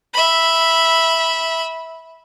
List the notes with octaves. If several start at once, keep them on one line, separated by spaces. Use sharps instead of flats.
E5 B5